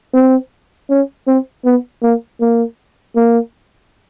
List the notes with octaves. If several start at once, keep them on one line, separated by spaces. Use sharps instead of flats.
C4
C#4
C4
B3
A#3
A#3
A#3